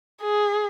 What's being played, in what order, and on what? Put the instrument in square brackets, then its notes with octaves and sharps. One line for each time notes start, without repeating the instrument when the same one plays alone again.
[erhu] G#4